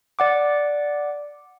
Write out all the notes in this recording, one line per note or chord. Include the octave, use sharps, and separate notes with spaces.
D5 F#5 D6